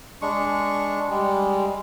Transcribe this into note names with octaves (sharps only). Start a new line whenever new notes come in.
G#3 D4 C#6
G3 G#3